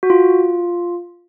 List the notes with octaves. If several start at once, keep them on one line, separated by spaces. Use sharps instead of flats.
F#4
F4